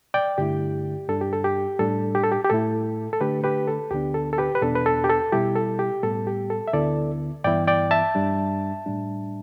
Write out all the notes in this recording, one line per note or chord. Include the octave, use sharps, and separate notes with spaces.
D5 G5
G2 D3 A3 E4 G4
G2 G3 D4 A4
G4
A4
G4
A2 G3 D4 A4
G4
A4
G4
G4
A2 A3 E4 A4
A4
D3 A3 D4 G4 B4
G4 B4
A4
D2 D3 B3 D4 G4
A4
A4
G4 B4
B4
E2 B2 B3 D4 A4
B4
A4
G4
A4
B2 G3 E4 G4
A4
G4
A2 G3 B3 A4
G4
A4
E5
D2 D3 B3 E4 A4 D5
G2 E3 B3 E4 D5 G5
D5 G5
E5 A5
G2 G3 D4
A2 G3 D4